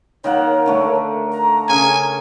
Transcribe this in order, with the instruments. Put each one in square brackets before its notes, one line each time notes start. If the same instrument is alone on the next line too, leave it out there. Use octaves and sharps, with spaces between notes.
[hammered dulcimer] D#3 A#3 F#5 [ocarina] C#5
[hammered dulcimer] D3 A3 A#3
[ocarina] A#5
[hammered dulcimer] C#3 [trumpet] G#5